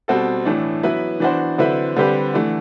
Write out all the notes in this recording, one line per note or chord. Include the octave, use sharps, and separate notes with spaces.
B2 G3 C4 F#4 A4
A2 E3 A3 D4
F#3 B3 E4 B4
E3 B3 D4 F#4 C5
D3 F#3 C4 E4 B4
D3 G3 C4 G4 B4
E3 A3 D4